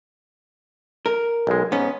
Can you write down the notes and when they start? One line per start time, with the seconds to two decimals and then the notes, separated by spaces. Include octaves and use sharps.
1.06 A#4
1.47 B1 G#3
1.72 G#2 B3 C#4